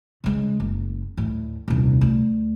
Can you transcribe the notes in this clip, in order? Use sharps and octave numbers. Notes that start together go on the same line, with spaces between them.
C#3 G#3
F#1
D2 A2
D#1 C2
D2